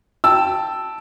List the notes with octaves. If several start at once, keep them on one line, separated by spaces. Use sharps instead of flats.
G5 A5 E6